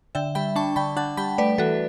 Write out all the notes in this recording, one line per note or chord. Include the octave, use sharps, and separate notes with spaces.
D3 E5 G5
G3 G5 B5
D4 A5 C#6
D3 G5 B5
D4 F#5 A5
G3 G5 B5
A3 B4 D5
E3 F#4 A4